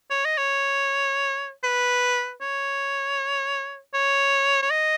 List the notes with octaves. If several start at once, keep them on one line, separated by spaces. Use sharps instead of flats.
C#5
D#5
C#5
B4
C#5
C#5
C#5
D#5